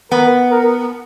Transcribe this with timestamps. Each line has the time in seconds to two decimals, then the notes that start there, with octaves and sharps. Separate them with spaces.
0.12 B3 A#4
0.51 A#4